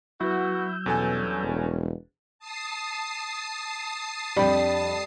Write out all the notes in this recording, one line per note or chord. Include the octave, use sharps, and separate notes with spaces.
F#3 B3 E4 F#4 E6 G6
E2 G2 B2 C#4 A4 G#5
E1
A5 D#6 C7
F2 G3 D4 G5 B5